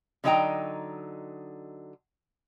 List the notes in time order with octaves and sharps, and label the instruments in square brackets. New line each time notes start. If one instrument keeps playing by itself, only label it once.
[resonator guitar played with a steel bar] D3 F#3 D#4 D#5 G5 A#5